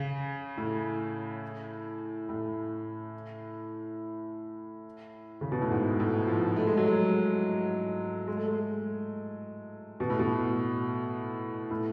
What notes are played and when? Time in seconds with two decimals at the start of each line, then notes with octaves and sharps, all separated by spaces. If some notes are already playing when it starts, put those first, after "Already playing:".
Already playing: C#3
0.57 A2
2.29 A2
5.41 C#3
5.52 B2
5.62 A2
5.71 G#2
6.00 A2
6.28 F3
6.56 A3
6.67 G#3
6.77 F#3
6.87 G#3
8.28 G#3
8.37 A3
8.48 G#3
10.00 B2
10.10 A2
10.19 B2
11.71 A2